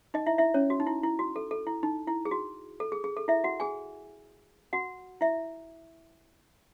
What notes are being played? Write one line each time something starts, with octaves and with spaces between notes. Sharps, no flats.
D#4 D#5
E4 E5
E4 E5
C#4 C#5
F#4
D#4
E4
E4
F#4
A4
A4
E4
D#4
E4
G#4
F#4
A4
G#4
G#4
A4
E4 E5
F#4 F#5
G#4 G#5
F#4 F#5
E4 E5